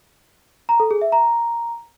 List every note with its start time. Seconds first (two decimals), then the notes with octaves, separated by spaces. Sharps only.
0.69 A#5
0.80 A4
0.91 G#4
1.01 E5
1.12 A#5